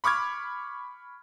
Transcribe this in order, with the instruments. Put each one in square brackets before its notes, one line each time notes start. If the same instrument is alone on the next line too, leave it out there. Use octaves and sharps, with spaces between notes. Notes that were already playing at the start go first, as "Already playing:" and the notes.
[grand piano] B5 C#6 D6 F6 G#6